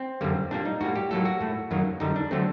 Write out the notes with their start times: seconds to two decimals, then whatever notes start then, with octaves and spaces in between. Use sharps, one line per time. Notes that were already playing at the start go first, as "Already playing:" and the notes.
Already playing: C4
0.21 F#2 D3 G3 A#3
0.51 A#2 G3 A#3 D4
0.65 D#4
0.81 A2 G3 A#3 F#4
0.96 G4
1.11 A2 F#3 A#3 A4
1.25 F#4
1.41 A2 A3
1.71 F#2 D#3 F#3 A#3
2.00 F#2 D3 G3 D#4
2.16 D4
2.31 D3 F#3 A3 C4